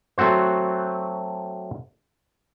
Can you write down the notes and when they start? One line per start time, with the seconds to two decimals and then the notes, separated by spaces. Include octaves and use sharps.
0.18 F#3 A3 C4 F#4 C5